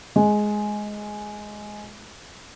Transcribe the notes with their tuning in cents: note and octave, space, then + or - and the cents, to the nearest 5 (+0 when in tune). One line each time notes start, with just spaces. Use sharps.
G#3 +10